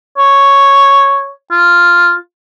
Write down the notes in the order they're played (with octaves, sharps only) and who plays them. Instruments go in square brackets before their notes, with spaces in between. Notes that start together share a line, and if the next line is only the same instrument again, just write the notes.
[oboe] C#5
F4